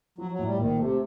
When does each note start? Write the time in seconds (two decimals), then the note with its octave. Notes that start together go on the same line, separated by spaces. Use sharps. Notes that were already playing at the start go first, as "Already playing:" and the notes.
0.18 F3 F#3
0.31 F#3
0.39 A2
0.45 G3
0.59 A#1 D#3
0.79 C3 A3